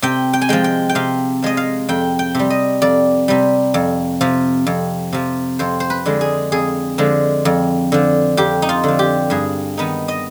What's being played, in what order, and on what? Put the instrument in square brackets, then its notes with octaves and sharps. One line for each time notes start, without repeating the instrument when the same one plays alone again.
[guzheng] C3 G5
G5
G#5
F3 G#3 G5
G5
G5
C3 F5
F3 G#3 D#5
F5
F2 G5
G5
C3 G3
D#5
F2 D5
C3 G3
F2
C3 F3
F2
C3 F3
F2 C5
C5
B4
D3 F3 G#3
G#4
F2 G#4
D3 F3 G#3
F2
D3 F3
F2 G4
D#4
F4
D3 F3
G4
G2 G#4
D#3 B3 D#4
D#5